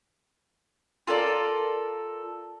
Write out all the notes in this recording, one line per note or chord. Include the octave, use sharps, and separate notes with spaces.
F4 A4 A#4 D5